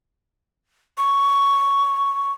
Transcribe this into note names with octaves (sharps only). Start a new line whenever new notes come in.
C#6